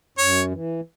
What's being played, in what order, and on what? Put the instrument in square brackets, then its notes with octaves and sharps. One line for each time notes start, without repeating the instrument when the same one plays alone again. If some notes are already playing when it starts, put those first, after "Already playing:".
[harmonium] F#2 [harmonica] C#5
[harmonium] E3